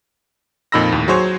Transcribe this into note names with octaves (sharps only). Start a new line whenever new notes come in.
F2 A#2 D#4 B5 E6 A#6
D#2 A2
F#3 F#4 G#4 C5 C#5